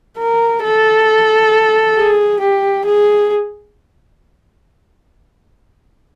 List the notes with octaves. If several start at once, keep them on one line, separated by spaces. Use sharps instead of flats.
A#4
A4
G#4
G4
G#4